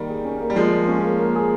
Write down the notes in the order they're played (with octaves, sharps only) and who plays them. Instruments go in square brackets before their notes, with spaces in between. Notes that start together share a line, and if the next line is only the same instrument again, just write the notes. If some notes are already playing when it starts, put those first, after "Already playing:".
Already playing: [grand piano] D#3 G3 [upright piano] A#3
[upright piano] G#4
C#4
A#3
[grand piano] G3
[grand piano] F3 G#3 [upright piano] A#3
[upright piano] G#4
C#4
A#3
A#3
G#4